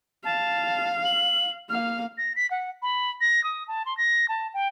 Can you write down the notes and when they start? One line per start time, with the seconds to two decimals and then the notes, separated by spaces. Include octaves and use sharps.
0.25 F5 A5
1.05 F#7
1.70 A#3 F5 F6
2.18 A#6
2.36 B6
2.51 F#5
2.82 B5
3.21 A#6
3.44 D#6
3.68 A5
3.86 C6
3.97 A#6
4.29 A5
4.54 G5